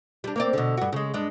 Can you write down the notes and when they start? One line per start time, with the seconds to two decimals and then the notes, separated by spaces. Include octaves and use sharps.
0.24 G3 D4
0.36 A#3 C4 D5
0.53 B2 D3
0.77 G2 F#4
0.93 C#3 G#3
1.14 G2 G#3 D4